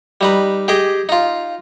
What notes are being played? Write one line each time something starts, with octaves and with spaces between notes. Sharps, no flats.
G3 D#4 B4
G4 G#4 D#5 G5
D#4 F4